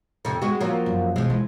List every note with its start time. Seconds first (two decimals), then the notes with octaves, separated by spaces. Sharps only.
0.25 F2 C3
0.42 G#3 B3 F#4
0.61 F3 F#3 A#3
0.86 F#2
1.16 B2 E3 F3 G#3
1.30 E3